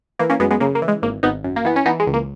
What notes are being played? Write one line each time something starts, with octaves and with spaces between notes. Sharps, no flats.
E3 A#3
A#3 C#4
F#2 G#3 B3
G#3 B3
C#3 A#3
A#3
E3
G#3
G#1 A#3
G#1 B3 D#4
F#2
A#3
E3 B3
C#4
E3 B3 D#4
G#3
C#2
A#3